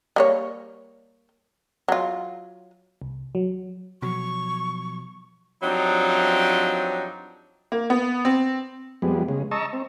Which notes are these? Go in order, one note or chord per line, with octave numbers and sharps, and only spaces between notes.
G3 A#3 C#5
F#3 F4
C2
F#3
B2 F3 F#3 C#6
G2 F3 F#3 C4 D4 D#4
A#3
B3
C4
F2 G3 G#3 B3
C#3 G#3
D#5 A5 A#5 C#6 E6
C4